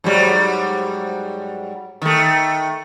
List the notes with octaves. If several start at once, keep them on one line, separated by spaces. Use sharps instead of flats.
G#2 F#3 G3
D#3 A3